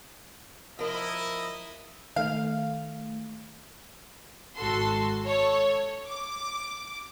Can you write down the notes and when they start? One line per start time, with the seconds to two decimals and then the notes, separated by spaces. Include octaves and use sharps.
0.79 F3 E4 A#4 D#5
2.16 D#3 A3 F5
4.56 G#1 F#4 A4 C6
5.21 A4 C#5
6.07 D6